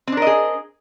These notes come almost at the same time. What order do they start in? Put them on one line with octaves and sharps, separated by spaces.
C4 D4 A#4 D#5 G#4